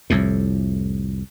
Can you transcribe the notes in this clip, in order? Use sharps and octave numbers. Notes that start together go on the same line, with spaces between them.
C2 F2 A2